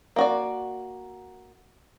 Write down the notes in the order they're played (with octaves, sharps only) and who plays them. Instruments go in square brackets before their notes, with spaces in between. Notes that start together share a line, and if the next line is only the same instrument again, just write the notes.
[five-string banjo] A#3 F#4 D5